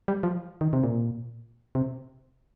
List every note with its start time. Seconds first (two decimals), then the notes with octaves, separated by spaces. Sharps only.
0.08 G3
0.23 F3
0.61 D#3
0.73 C3
0.84 A#2
1.75 C3